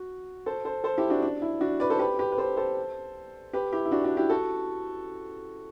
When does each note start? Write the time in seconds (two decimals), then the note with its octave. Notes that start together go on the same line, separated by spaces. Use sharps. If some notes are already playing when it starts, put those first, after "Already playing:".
Already playing: F#4
0.46 A4 C5
0.65 A4 C5
0.84 A4 C5
0.98 E4 G4
1.10 D4 F#4
1.22 D4
1.42 E4
1.61 D4 F#4
1.80 B4 D5
1.90 A4 C5
1.99 G4 B4
2.19 G4 B4
2.32 B4
2.38 A4 C5
2.57 A4 C5
3.53 G4 B4
3.73 E4 G4
3.85 E4
3.91 D4 F#4
4.04 D4 F#4
4.17 E4 G4
4.30 F#4 A4